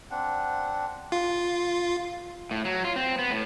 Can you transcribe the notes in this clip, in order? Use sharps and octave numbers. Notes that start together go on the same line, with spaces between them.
C4 D4 F#5
F4
A2
F#3
F4
C4
B3
A2